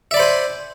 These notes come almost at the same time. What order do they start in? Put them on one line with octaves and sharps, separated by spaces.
E5 D5 B5 C5 G#5